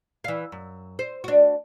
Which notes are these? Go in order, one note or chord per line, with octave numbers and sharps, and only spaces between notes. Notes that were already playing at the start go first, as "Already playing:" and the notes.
E3 F5
F#2
C5
D4 F#4